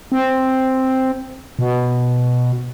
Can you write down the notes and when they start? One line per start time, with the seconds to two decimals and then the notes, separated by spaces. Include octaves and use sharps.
0.12 C4
1.59 B2